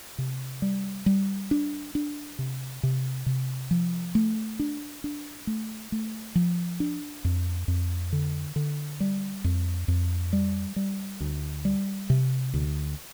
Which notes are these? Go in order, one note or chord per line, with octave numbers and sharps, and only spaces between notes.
C3
G3
G3
D4
D4
C3
C3
C3
F3
A3
D4
D4
A3
A3
F3
D4
F2
F2
D3
D3
G3
F2
F2
G3
G3
D2
G3
C3
D2